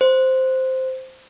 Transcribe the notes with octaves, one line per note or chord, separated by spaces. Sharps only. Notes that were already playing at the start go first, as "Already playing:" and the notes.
C5